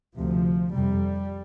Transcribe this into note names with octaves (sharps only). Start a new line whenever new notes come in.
D2 C3 F3
F2 C3 G3